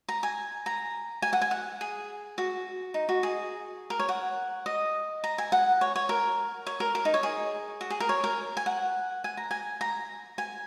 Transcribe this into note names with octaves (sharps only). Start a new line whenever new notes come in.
A#5
G#5
A#5
G#5
F#5
G#5
F#5
G#4
F#4
D#4
F#4
G#4
A#4
C#5
F#5
D#5
A#5
G#5
F#5
C#5
C#5
A#4
C#5
A#4
A#4
D#4
C#5
G#4
F#4
G#4
A#4
C#5
A#4
G#5
F#5
G#5
A#5
G#5
A#5
G#5